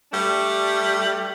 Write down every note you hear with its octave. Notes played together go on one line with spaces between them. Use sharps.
G3 A3 D4 B4